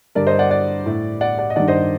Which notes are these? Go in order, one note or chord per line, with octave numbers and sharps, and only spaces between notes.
G2 D3 A#4 D5
C5 D#5
D5 F#5
D5 F#5
A2
D5 F#5
D5 F#5
D#5
G2 D#3 D5 F#5
C5 D#5